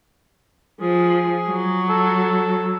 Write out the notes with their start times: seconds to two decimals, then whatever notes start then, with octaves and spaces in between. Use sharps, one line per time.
0.81 F3 G#4
1.48 F#3
1.89 A4